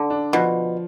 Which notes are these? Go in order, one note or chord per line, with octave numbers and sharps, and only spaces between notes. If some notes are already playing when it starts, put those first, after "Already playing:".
Already playing: D3
D4
B2 F3